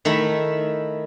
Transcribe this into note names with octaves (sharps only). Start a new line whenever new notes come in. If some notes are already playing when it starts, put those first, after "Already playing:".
D#3 A3 E4 B5